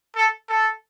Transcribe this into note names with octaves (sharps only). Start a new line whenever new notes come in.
A4
A4